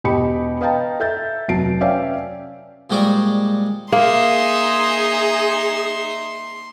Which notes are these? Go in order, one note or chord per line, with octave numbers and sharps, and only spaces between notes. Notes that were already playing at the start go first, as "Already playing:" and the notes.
E1 G4 D#5 B5 C#7
B4 D#5 F5 G5 A5 A#5
A4 E5 G6 A6
F1 F#3 A5 C7 D7
C#4 B4 D5 E5 F5 G5
A#2 G3 G#3 C5 D5 C#6
A#3 D#4 G#4 E5 C6